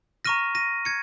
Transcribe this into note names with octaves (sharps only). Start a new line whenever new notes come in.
A#5 C#6 F6 A#6 D#7
A#6 D#7
G#6 C#7